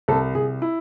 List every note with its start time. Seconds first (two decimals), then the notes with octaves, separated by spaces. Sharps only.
0.08 C2 A4
0.35 C2 G#4
0.62 E4